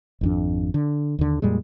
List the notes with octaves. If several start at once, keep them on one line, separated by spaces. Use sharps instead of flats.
G#1 F2 D4
D3
D#2 D3
F2 A#2 G3 G#3